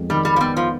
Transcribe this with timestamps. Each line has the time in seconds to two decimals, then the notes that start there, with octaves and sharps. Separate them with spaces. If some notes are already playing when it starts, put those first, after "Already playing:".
Already playing: F2 G#3 B3
0.10 D#3 G3
0.25 G3
0.36 F3
0.40 G3 B3
0.57 F3